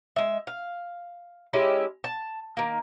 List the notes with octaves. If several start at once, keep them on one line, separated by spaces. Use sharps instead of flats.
G#3 E5
F5
G#3 C#4 E4 G4
A5
D#3 A#3